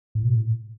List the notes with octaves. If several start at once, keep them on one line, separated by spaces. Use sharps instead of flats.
A2
B2
A2